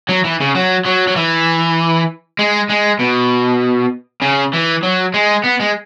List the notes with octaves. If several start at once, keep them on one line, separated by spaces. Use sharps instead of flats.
F#3
E3
C#3
F#3
F#3
F#3
E3
G#3
G#3
B2
C#3
E3
F#3
G#3
B3
G#3